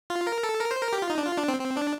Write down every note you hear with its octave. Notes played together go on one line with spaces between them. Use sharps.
F4
A#4
A4
A#4
C5
A#4
G4
F4
D#4
D4
F4
D4
C4
C4
D4